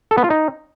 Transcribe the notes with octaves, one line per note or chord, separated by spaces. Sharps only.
A4
B3
F4
D#4